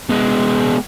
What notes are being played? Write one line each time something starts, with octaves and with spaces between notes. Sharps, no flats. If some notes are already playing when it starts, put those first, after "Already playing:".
G#3 B3